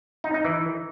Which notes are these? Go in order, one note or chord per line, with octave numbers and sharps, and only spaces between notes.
D#4
D#4
E3